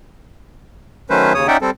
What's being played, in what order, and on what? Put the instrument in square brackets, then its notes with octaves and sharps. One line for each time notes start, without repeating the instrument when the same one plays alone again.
[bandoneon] D#3 F#3 A3 C#4 B4 C5
D#2 C#3 C#5 D#6
C#4 D#4 D5 E5 F#5 G5
G3 C4 A4